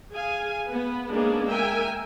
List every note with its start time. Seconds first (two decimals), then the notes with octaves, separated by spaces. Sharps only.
0.14 G#4 F5 G#5
0.68 B3 B4
1.10 G#3 A#3 B3 C#4 D4 G#4
1.47 A#4 E5 G5 G#5